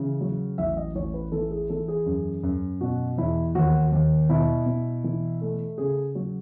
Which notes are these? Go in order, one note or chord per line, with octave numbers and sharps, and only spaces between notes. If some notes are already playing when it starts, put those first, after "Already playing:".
Already playing: C#3 E3
F#3
A1 E5
D#5
A1 C#5
B4
E3 A4
G#4
E3 A4
G#4
F#2
F#2
B2 F#4
E2 E4
D#2 F#4
D#2
B2 E4
B2
E3
A3
C#3 G#4
F#3